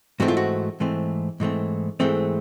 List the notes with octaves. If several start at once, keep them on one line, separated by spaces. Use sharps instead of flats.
G#2 E3 A3 C4 F#4
F4
F#4
G#2 E3 A3 C4
G#2 E3 A3 C4
G#2 E3 A3 C4